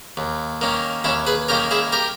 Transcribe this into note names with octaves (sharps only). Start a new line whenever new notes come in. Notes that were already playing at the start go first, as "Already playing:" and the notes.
D#2
D#3 A#3 C#4
D#2 C#4 E4
G#4 B4
D#3 A#3 C#4 G4 A#4
E4 G#4
G4 A#4